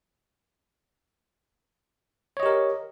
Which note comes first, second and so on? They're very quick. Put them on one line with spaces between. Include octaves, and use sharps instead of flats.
C#5 D#5 G4 A#4